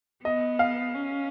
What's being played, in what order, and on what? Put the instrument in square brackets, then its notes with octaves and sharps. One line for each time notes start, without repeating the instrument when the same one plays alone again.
[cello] B3 [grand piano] D#5
[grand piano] F5
[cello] C#4